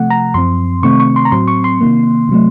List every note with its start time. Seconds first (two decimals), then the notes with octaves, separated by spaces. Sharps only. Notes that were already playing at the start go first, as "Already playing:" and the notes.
Already playing: C3 F3 A3 F#5
0.10 A#5
0.34 F#2 F3 C4 C6
0.83 C3 D#3 A3 C4 C#6
1.00 C#6
1.16 C6
1.25 A#5
1.32 A2 F#3 C4 C6
1.48 C#6
1.64 C6
1.81 C3 D#3 A#3
2.29 C3 F#3 A3